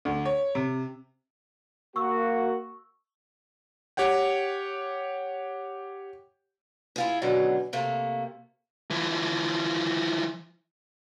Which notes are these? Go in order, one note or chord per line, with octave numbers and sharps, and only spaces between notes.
D2
C#5
C3
A#3 F#4 C#6 E6
G4 C#5 F#5 G5
E4 F4 G#4
B2 D3 F#3 C#4 G#4
C3 A3 A#3
E3 F3